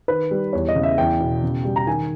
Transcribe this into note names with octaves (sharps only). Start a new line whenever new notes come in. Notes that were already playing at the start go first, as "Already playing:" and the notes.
D#3 B4
G3
E2 C#5
D#5
C#3
E5
E2 G5
B2
C#3
G3
A#5
D#3 G#5